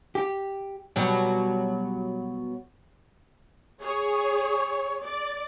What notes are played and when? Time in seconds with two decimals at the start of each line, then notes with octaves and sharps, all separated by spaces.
0.15 G4
0.96 B2 F#3 G3
3.81 G#4 C#5
5.00 D5